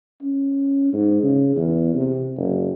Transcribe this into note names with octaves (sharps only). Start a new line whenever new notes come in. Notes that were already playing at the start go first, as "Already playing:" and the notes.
C#4
G#2
C#3
E2
C3
F#1